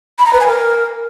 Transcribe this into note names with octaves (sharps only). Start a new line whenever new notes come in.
B5
A#5
B4
G#5
A#4